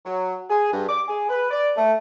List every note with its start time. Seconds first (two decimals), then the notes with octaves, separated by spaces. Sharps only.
0.05 F#3
0.50 G#4
0.72 G2
0.88 D6
1.08 G#4
1.29 B4
1.51 D5
1.76 A3